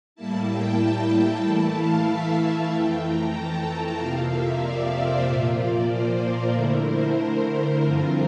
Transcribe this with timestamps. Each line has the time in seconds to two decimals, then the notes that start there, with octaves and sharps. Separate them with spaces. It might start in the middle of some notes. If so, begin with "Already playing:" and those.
0.15 A2 G3 A#3 E4 A5
0.48 G5
0.79 A5
1.11 A5
1.43 E3 A3 E4 A5
1.75 F5
2.07 E5
2.39 F5
2.70 F2 E3 A3 G5
3.02 A#5
3.34 A5
3.66 A5
3.98 F2 C3 F3 A#3 F5
4.30 E5
4.61 D5
4.93 C5
5.25 A#2 F3 A#3 F4
5.57 D5
5.89 C5
6.21 A#4
6.53 D3 A3 E4 A#4
6.84 C5
7.16 A#4
7.48 C5
7.80 G2 D3 F3 C4 F4 A#4